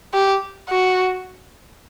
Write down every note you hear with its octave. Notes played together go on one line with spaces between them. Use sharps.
G4
F#4